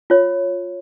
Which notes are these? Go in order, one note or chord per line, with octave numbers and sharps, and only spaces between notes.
F4 C#5